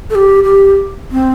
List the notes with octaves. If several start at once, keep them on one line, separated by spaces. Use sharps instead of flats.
A4
G4
G4
C4